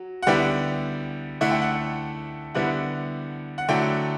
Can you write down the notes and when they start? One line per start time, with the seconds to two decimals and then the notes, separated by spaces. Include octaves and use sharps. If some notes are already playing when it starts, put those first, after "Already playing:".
Already playing: F#3
0.22 F#5
0.27 D3 G3 B3 E4 G5
1.41 D3 A3 E4 F#5
1.51 G5
1.62 F#5
2.55 D3 G3 B3 E4 F#5
3.58 F#5
3.69 D3 F#3 A3 E4 G5